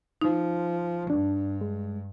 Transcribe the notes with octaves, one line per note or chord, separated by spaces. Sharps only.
F3 D#4
G2 D4
G#3